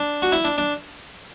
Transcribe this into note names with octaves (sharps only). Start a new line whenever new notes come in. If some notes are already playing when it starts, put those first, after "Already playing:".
Already playing: D4
F#4
E4
D4
D4